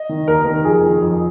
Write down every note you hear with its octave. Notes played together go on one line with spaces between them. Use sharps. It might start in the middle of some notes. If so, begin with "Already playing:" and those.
Already playing: D#5
D#3
D#2 A#4
D#3 A#4
F2 G#4
D#3
F2